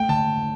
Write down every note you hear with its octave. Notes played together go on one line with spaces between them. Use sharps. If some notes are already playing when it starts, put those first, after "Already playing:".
Already playing: A3 G5
D3 A5